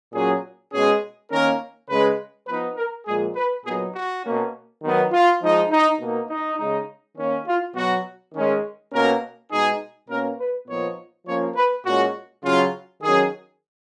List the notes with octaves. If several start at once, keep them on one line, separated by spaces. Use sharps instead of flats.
A#2 F#3 C#4 G#4
B2 G#3 C#4 G#4
D#3 A#3 C#4 A#4
C#3 G#3 C#4 B4
F3 B3 D#4 B4
A#4
A#2 F3 G#3 G#4
B4
A#2 F#3 B3 D#4 G#4
F#4
B2 A#3 C#4
D#3 F#3 B3
F4
F3 G#3 D#4
D#4
B2 A#3 D#4
D#4
C#3 G#3 D#4
D#3 A#3 C#4
F4
B2 F#3 B3 F#4
D#3 G#3 C#4
B2 A#3 C#4 A#4
B2 G#3 D#4 G#4
B2 A#3 C#4 A#4
B4
A#2 F3 B3 D#4 C#5
F3 A#3 C#4 C#5
B4
A#2 G#3 C#4 F#4
C#3 F#3 C#4 F4
D#3 F#3 C#4 G#4